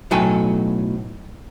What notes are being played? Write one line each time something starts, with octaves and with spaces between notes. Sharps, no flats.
B1 A2 F#3 A4 G5 G#5